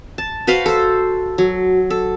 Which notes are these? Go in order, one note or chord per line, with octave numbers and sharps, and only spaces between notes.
A5
F#4 B4 C5 F5
A4 C5
F#3
A4